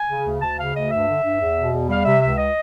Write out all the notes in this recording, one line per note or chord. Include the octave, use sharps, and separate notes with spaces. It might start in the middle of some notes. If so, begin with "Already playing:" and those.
Already playing: G#5
C#3
D2
D2 A5
C#3 F5
D2 D#5
G2 E5
D3
G2
E2
B2
E2
G3 F5
C3 E5
C#2 E5
D#5